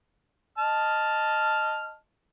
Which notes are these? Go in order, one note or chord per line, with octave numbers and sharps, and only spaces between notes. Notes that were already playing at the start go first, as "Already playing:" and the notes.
D#5 A5 F6